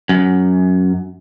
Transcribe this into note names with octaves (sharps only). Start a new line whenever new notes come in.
F#2